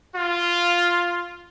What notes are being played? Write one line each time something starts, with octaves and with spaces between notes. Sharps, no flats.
F4